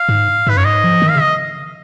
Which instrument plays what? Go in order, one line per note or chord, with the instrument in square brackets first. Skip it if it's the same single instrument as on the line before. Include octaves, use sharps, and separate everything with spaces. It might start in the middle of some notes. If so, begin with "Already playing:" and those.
Already playing: [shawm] F5
[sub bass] G#2
[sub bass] G#2 [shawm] B4
[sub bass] F#2 [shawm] C#5
[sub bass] G#2 [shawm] D#5
[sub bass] F3
D#3
[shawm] F5
[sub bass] C#3
[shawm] D#5